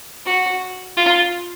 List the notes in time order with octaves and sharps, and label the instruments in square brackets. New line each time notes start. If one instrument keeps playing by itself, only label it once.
[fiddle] F#4
F4